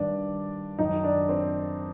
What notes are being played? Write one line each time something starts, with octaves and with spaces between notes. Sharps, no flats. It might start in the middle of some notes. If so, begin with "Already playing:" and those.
Already playing: G2 D#3 D4 D5
F#2 D#3 D#4 D#5
D4 D5
C4 C5